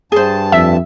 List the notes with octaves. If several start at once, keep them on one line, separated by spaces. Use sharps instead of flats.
G2 G#4 C5 A5
F2 E5